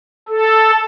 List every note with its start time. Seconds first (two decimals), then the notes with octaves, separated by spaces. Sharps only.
0.28 A4